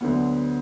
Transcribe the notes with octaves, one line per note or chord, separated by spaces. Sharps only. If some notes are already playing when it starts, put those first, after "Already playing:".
D2 D3 F#3 B3